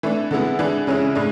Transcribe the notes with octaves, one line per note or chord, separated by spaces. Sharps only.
E3 A3 D4
D3 G#3 B3 E4
E3 G#3 D4
C#3 G#3 C#4 E4
A2 G#3 D4